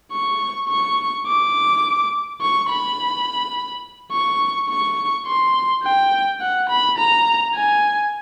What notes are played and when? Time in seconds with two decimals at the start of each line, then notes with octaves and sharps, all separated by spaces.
0.12 C#6
0.69 C#6
1.27 D6
2.41 C#6
2.69 B5
4.12 C#6
4.69 C#6
5.27 C6
5.84 G5
6.41 F#5
6.69 B5
6.98 A#5
7.55 G#5